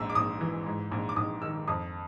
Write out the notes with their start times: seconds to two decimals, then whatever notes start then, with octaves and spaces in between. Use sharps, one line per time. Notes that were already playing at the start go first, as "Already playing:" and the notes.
Already playing: A#1 G#2 E6
0.09 D6
0.15 A#1 D#6
0.41 E3
0.66 G#2
0.92 A#1
1.09 D6
1.16 A#1 D#6
1.42 D#3 E6
1.68 F2 D#6